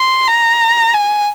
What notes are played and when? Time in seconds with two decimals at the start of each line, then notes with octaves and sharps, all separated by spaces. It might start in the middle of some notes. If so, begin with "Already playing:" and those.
Already playing: C6
0.27 A#5
0.94 G#5